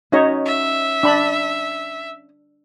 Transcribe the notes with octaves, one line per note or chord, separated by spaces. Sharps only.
C#4 D#4 F#4 C#5 D#5
E5
D4 B5